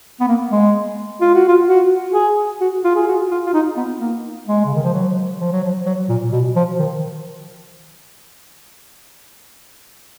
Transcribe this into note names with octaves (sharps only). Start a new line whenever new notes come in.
B3
A#3
G#3
F4
F#4
F4
F#4
G#4
F#4
F4
G#4
F#4
F4
F4
D#4
B3
A#3
G#3
C#3
D#3
F3
F#3
F3
F#3
F3
F#3
A#2
B2
F3
D#3